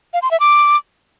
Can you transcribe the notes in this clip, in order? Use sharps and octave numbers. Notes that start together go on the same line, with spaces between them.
F5
C6
E5
D6